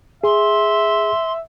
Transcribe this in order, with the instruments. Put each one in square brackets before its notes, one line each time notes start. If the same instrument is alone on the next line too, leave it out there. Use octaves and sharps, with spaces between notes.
[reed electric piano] G#4 [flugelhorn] E5 [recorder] C6